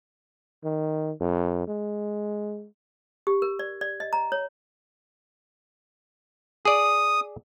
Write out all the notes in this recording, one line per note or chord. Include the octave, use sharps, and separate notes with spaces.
D#3
F2
G#3
G4
A#4
D5
D5
D#5
A#5
C#5
G#4 D5 D#6